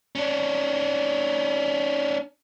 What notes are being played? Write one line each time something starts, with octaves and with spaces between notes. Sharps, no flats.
C#4 D4